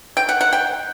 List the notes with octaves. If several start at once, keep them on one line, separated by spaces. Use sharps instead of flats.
G5
F#5
F#5
G5